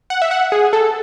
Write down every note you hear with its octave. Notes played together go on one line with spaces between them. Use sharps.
F#5
E5
F#5
G#4
A4